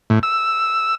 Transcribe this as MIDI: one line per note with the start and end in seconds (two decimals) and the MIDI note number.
0.10 0.19 45
0.23 0.95 88